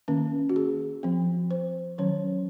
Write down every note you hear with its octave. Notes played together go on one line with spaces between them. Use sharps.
D#3 A#3 C#4
F#4
G#4
F3 C4
C5
D#3 F#3 C#4 C#5